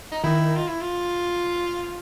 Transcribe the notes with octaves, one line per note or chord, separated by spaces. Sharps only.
D#4
D#3 E4
F4
E4
F4